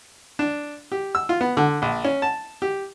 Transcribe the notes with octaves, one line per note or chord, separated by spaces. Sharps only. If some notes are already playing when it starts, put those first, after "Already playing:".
D4
G4
E6
F4
B3
D3
A#1
C#4
A5
G4